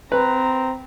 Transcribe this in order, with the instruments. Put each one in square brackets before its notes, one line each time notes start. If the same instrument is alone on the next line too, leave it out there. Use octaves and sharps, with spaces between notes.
[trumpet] C4 [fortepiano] B4 [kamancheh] A#5